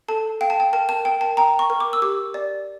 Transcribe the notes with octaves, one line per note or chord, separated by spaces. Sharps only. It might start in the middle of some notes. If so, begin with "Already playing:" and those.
A4 A5
F5 G5
A5
G5
A#4 A5
A5
A#4 G5
A5
G5 A#5
C#6
A#4
D6
E6
G4 D6
D5